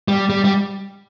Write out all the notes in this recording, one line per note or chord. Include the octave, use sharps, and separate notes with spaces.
G3
G3
G3